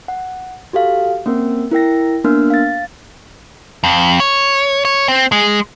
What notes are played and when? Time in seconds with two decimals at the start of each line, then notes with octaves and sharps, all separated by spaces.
0.08 F#5
0.73 F#4 G4 A4 F5
1.26 A#3 C4 C#4 A#4
1.71 E4 A#4 G5 A#6
2.24 A#3 B3 D4 A#4 F6
2.50 F5 A6
3.84 F2
4.20 C#5
4.85 C#5
5.08 C4
5.32 G#3